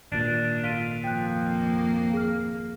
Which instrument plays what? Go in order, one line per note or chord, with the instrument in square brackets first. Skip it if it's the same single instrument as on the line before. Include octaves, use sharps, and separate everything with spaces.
[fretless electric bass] G#1 A#2 [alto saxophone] D4
[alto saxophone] F4 [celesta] B6 D7 D#7
[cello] F2 A#3 [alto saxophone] F3 [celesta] G5 F#6
[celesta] G#4 F6